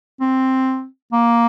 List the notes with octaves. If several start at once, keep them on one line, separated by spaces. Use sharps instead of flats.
C4
A#3